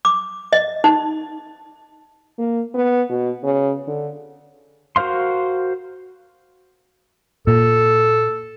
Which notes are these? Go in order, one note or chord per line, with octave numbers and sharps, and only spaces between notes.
D6
D#5
D#4
A#3
B3
B2
C#3
D3
F#4 A#4 C5 F5 C6
A#2 A4